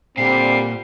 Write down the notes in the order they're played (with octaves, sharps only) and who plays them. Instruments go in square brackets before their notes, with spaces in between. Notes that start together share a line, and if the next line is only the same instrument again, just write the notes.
[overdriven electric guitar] A#2 [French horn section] D3 G3 C4 [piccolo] C7